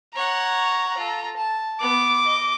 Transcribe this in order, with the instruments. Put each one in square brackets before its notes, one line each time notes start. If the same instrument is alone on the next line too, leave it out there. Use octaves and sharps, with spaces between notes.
[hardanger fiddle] C#5 F#5 [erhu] A#5
[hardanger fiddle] F4 A4
A5
[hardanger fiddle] B3 [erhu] D6
[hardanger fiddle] D#5